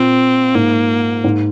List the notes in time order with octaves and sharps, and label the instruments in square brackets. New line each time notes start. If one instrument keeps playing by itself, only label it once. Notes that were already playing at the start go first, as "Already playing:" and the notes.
Already playing: [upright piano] A#2 [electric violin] C4
[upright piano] G#2 [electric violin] A#3
[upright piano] G#2